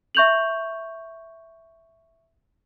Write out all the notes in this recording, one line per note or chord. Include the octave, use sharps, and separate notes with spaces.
E5 C#6 G6 F7 F#7